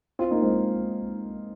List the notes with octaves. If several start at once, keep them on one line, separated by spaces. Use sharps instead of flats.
C4 F4
A#3 D#4
G#3 C4